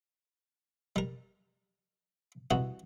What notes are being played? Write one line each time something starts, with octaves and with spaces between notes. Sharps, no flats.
G3 A#4
C2 E3 F#4 D#5